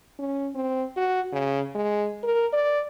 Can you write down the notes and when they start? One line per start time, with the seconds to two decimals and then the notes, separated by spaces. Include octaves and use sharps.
0.19 C#4
0.55 C4
0.97 F#4
1.33 C#3
1.75 G#3
2.23 A#4
2.53 D5